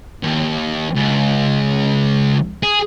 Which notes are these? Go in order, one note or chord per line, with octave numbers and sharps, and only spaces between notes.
D#2
C#2
G#4